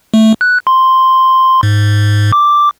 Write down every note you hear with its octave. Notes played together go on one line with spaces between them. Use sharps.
A3
F#6
C6
G#2
D6